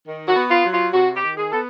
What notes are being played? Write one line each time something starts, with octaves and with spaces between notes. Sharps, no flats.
D#3
F#4
B3
F4
F#3
F4
C3 F#4
G4
D#3
G#4
B3 A4